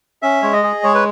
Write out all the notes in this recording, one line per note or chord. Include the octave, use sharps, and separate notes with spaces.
C#4 E5
G#3 C#5
D#5
G#4
G#3 C#5
B4